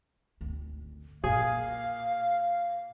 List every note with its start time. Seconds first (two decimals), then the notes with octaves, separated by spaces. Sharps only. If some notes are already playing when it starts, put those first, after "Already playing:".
0.41 G#1 D2
1.24 A#2 G#4 F5